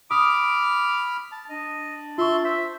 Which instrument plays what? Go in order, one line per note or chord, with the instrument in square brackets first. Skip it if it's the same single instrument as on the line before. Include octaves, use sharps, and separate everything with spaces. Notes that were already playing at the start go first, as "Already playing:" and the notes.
[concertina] B5 F6 [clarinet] D6 [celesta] D#6
[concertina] A5
[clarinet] D4 [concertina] D#5
[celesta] F4 C#6 [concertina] E5 C6
[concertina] C5 [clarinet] E5